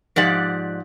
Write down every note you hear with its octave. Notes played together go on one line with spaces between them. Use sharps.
G#2 F3 G4 D5 F#5